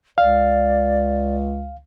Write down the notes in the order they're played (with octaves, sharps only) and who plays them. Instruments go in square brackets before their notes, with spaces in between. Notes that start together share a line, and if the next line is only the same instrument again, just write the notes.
[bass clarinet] C#2 [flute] D5 [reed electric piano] F5